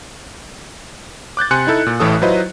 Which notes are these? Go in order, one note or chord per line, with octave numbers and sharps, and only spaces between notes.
D6 F#6 G6 A6
C3 G#5 C6 F#6 C#7
D#4 E4 A4
A#2
A1 A2 E3 A4 D#6
F#3 E4 F4 B4 C5 D#5